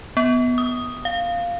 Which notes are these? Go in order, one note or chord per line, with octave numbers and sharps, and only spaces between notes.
B3
D#6
F5